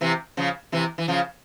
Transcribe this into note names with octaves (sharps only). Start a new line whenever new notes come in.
C3 E3
C#3 F3
C3 E3
E3
C#3 F3